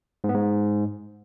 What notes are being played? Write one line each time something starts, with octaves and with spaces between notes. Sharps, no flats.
G#2
B3
G#2